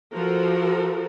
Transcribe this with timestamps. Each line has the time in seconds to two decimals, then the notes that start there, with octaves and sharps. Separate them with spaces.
0.14 F3 F#4 A4 A#4